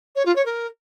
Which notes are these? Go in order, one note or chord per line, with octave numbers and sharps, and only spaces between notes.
C#5
F4
C#5
A#4